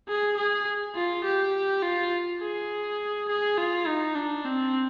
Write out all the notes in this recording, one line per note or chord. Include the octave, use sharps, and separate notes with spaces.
G#4
G#4
F4
G4
F4
G#4
G#4
F4
D#4
D4
C4